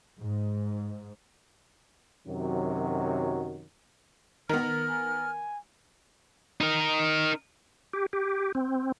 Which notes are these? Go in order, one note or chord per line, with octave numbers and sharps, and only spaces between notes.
G#2
F#2 C3 D#3 F#3
D#3 B3 A#4 F6
G#5
D#4 A#4
G4
G4
C4